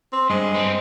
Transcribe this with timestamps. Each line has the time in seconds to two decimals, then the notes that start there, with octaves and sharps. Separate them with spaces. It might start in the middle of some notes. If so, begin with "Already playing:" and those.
0.13 C4
0.30 G2 G#3
0.54 B3 C4